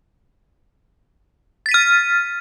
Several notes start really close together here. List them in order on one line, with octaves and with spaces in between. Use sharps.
A6 B6 D#7 F6